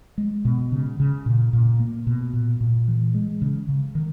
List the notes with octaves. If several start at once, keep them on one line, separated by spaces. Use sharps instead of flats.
G#3
B2
C#3
C#3
A#2
A#2
A#3
B2
A#2
A#2
E3
G#3
C#3
C#3
D#3